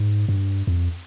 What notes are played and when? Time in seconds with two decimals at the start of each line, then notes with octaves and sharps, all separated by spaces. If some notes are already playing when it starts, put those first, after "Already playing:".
Already playing: G#2
0.29 G2
0.67 F2